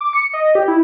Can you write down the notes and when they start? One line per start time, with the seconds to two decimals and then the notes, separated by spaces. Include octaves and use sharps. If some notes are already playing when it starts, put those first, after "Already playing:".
0.01 D6
0.13 C#7
0.33 D#5
0.55 G4
0.68 E4